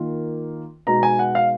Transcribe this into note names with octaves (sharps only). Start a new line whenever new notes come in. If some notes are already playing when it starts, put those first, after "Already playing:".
Already playing: D#3 A#3 F4
B2 G#3 D#4 A#5
G#5
F#5
F5